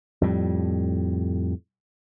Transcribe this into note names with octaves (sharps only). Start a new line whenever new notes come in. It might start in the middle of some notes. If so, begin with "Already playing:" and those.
F2 A2 G3